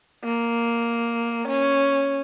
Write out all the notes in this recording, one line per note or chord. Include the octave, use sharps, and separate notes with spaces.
A#3
C#4